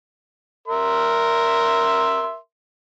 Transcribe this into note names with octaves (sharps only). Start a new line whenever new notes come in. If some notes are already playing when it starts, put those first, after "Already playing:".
A#4 E5 C6